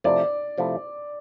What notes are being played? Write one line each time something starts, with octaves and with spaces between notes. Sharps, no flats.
C3 F3 A3 E4 D5
C3 F3 A3 E4